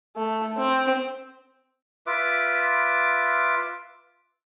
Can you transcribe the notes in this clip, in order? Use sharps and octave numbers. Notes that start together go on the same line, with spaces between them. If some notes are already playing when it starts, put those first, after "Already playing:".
A3
C4
F4 B4 E5 D6